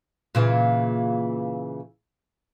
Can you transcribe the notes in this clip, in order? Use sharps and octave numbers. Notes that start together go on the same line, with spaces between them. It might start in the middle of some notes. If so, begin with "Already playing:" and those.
A#2 C#3 E3